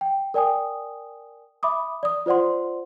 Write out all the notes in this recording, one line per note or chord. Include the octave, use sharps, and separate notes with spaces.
G5
A#4 D5 G5 G#5 D#6
E5 B5 D6 D#6
D5 D#6
F4 C5 D5 F#5 C6